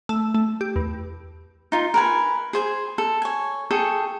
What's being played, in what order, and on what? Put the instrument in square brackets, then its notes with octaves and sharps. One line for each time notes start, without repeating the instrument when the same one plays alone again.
[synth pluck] A3
A3
G4
E2
[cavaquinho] D#4 F4
A#4 B4 G#5
G#4 C5 G#5
A4
C#5 G#5
G#4 A4 G5 C#6